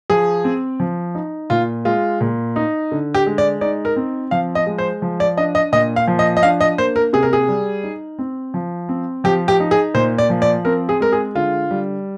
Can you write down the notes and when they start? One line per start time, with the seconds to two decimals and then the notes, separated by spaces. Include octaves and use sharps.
0.10 F3 G#4
0.44 C4
0.80 F3
1.15 D#4
1.50 A#2 F4
1.85 G#3 F4
2.21 A#2
2.56 D#4
2.92 D3
3.15 G4
3.26 G#3
3.38 D5
3.61 D#4 D5
3.85 A#4
3.96 C4
4.31 F3 F5
4.55 D#5
4.67 G#3
4.78 C5
5.02 F3
5.20 D5
5.37 D4 D#5
5.55 D#5
5.72 A#2 D#5
5.96 F5
6.08 F3
6.19 D#5
6.37 D#5
6.43 D4 F5
6.61 D#5
6.78 A#3 C5
6.96 A#4
7.13 C3 G#4
7.23 A#4
7.33 G#4
7.49 G3
7.83 D#4
8.19 C4
8.54 F3
8.89 C4
9.24 F3 G4
9.48 G4
9.60 D#4
9.71 G#4
9.94 A#2 C5
10.18 D5
10.30 F3
10.42 D5
10.65 C4 A#4
10.89 G#4
11.00 G#3 A#4
11.12 G#4
11.35 D3 F4
11.71 G3